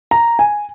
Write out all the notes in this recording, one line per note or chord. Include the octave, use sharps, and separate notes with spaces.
A#5
G#5